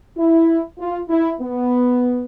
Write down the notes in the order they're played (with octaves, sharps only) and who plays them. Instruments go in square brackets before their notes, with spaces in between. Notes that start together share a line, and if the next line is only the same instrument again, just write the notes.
[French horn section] E4
F4
E4
B3